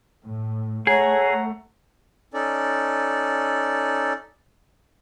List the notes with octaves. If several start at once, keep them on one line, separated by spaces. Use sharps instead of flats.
A2
A3 G#4 C#5 F#5 A#5
C#4 D#4 A4 D5